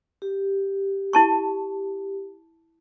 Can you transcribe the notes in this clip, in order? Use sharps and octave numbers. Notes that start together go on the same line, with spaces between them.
G4
E4 A5 C#6